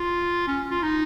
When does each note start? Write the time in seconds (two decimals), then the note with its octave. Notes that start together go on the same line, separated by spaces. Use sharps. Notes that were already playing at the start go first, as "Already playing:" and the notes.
Already playing: F4
0.47 C#4
0.70 F4
0.83 D#4